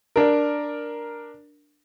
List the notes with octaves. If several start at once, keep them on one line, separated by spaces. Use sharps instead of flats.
D4 A#4